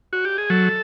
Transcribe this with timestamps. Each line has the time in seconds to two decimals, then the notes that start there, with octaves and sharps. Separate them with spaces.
0.13 F#4
0.25 G4
0.38 G#4
0.50 F#3 A4